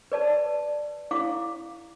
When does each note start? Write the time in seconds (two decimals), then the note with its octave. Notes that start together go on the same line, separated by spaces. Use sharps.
0.12 B4 D5 A5
1.11 E4 F5 D6